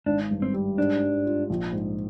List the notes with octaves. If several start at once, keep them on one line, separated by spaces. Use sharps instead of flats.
G#1 D4
G2
C4
G3
G#2 D4
G3
F4
A#1
G#2